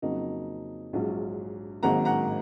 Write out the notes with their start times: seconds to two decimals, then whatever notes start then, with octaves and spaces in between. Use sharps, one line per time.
0.02 F2 C#3 F#3 A#3 D#4
0.93 A#1 G#2 F#3 C#4 F4
1.83 G#1 G#2 D#3 F#3 A#3 F#5 A#5
2.05 F#5 A#5